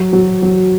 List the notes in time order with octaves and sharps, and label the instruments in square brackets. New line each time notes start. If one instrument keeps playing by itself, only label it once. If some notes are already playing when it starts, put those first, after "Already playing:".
Already playing: [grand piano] F#3
F#3
F#3